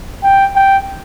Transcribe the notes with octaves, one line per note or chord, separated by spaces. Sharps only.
G5
G5